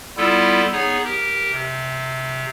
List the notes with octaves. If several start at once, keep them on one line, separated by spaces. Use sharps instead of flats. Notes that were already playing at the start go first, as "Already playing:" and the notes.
G3 B3 E4 F4 A4
B3 D#4 G#4 C#5
G4 A#4
C3